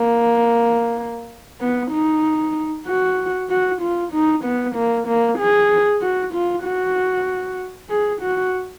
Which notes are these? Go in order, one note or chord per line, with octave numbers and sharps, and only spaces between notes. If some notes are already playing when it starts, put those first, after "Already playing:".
Already playing: A#3
B3
D#4
F#4
F#4
F4
D#4
B3
A#3
A#3
G#4
F#4
F4
F#4
G#4
F#4